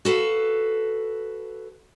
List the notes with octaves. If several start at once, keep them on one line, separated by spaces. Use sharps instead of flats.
F#4 A4 B4 F5